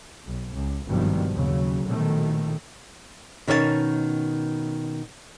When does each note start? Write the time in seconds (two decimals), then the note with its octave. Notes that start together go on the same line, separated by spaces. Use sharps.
0.25 B1
0.54 C#2
0.87 G#1 G2 B2 D#3 F3
1.33 D#2 C#3 F#3
1.86 A#1 B2 D#3 A3
3.48 B2 D#3 C#4 C#5 E5 A5